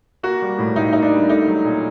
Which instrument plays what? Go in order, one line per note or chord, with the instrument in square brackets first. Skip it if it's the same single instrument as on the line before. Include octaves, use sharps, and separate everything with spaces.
[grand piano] A#3 F#4
G3
A2
A2 D#4
A#3 D#4
D4
G3
A3 D#4
F#3
A#2